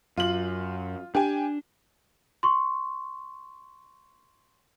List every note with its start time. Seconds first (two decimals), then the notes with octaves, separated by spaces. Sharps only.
0.17 F#2 F4 F#7
1.15 D4 G4 G#5
2.43 C6 C#6